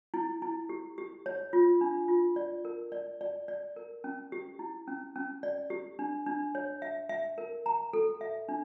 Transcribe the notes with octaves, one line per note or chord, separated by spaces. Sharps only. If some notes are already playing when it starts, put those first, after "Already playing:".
E4
E4
G4
G4
C#5
F4
D4
F4
D5
A#4
D5
D5
D5
A#4
C#4
G4
E4
C#4
C#4
D5
G4
D4
D4
C#5
E5
E5
A#4
A#5
A4
E5
D4